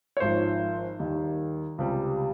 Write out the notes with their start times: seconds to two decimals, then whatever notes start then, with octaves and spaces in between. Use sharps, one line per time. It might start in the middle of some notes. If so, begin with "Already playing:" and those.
0.17 C#5
0.20 G#1 G#2 F3 C5
0.99 D#2 D#3 G3
1.78 C#2 C3 G3